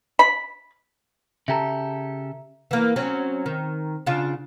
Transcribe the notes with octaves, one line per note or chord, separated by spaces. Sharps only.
B5
C#3 G4 A4 E5 A#5
E3 A#3
F#3 C4 C#4
D#3
C#3 D4 F4